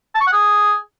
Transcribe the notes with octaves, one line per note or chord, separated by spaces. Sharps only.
A5
C#6
F#5
G#4